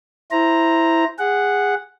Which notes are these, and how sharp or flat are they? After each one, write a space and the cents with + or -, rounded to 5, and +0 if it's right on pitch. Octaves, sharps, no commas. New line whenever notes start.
E4 +0 C5 +0 A#5 +0
G#4 -20 F#5 +0